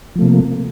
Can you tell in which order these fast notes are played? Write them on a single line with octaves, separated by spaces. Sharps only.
F3 A3 C3 A#3